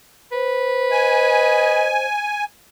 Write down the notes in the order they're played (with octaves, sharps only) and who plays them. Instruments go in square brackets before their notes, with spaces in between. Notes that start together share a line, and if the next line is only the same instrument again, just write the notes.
[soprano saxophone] B4 [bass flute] C5
[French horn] D#5 [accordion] G#5